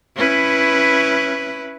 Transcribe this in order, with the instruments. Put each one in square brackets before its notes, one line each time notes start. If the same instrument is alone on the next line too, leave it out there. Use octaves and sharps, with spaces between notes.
[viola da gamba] C#4 E4 B4